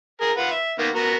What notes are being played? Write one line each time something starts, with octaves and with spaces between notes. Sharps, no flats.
G#4 A#4
F4 B4 F#5
E5
D#3 A#3 B3
B3 F#4 A#4